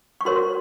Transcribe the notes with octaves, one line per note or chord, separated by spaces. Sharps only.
C#6
F#4 A#4 C#5 C6